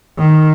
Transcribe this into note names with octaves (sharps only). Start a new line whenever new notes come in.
D#3